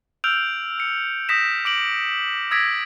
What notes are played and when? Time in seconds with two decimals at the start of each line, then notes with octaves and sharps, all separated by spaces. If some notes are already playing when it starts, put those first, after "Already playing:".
0.24 E6 F6 G6 D7 F7
0.80 C#7
1.29 D#6 G6 A#6 B6 E7
1.65 D6 D7 F#7
2.51 D#6 E6 G#6 A#6 B6 D7